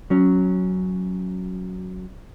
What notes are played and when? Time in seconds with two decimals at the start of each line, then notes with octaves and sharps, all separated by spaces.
0.10 F#3 C#4